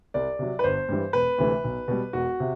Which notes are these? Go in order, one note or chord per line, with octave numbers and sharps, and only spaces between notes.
C2 D5
C3 F#3
B4
G1 C5
G2 E3 G3
E1 B4
D2 C3 E3 A3
B1
B2 G3
E1 F#4
C3